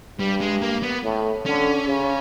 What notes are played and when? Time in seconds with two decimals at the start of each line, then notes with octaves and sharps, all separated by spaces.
0.19 G2 G3
0.40 G#3
0.62 A#3
0.83 B3
1.04 A2
1.46 D3 C#4
1.87 C#3